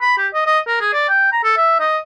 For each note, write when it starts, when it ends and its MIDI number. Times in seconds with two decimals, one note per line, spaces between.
0.01 0.17 83
0.18 0.28 67
0.34 0.43 75
0.46 0.59 75
0.67 0.76 70
0.81 0.93 68
0.93 1.07 74
1.09 1.29 79
1.32 1.43 82
1.44 1.53 69
1.57 1.80 76
1.80 1.98 75